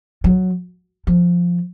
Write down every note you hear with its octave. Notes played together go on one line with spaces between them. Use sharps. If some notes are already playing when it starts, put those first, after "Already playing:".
F#3
F3